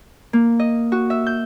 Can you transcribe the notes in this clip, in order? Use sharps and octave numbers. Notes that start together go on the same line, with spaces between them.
A#3
D#5
F#4
E5
G6